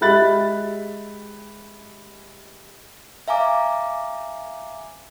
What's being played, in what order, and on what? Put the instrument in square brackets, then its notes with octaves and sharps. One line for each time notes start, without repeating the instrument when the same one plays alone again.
[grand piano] G#3 G4 E5 B5 F#6 A6
[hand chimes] E5 F5 G#5 A#5 D6